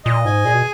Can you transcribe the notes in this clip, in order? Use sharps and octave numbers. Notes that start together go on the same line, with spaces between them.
A#2 D#5
G#2 G#5
A#2 G#4
B2